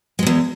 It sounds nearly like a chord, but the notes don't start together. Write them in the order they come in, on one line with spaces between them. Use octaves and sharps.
G#3 G#2 E2